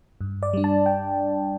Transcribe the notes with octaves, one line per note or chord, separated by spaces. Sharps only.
G2
D5
G3 D4
A5
G5